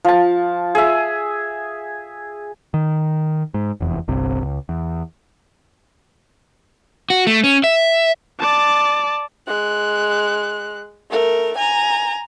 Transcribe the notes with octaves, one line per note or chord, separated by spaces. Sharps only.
F3 A5
G#4 E5
D#3
G#2
F1 E2
G1 C2 C3
C#2
E2
F#4
A3
C#4
E5
D5 A5
G#3 F#6
A3 A#4
G#5 A#5